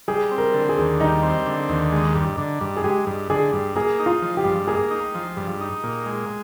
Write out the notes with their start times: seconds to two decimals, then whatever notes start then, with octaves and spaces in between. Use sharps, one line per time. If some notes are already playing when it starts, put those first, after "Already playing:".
0.08 G3 G#4
0.31 C4
0.38 A#4
0.54 D3
0.69 G#4
0.77 D#2
1.00 G3 D#4
1.23 C4
1.46 D3
1.69 D#2
1.92 G#3
2.15 G2
2.38 D3
2.61 G2
2.77 G#4
2.84 G#3 G4
3.07 G2
3.30 D3 G#4
3.53 G2
3.75 A#3 G#4
3.99 D#4
4.06 F4
4.22 F3
4.37 G4
4.45 G2
4.67 A#3 G#4
4.91 D#4
5.15 F3
5.37 G2
5.60 D#4
5.84 A#2
6.06 G#3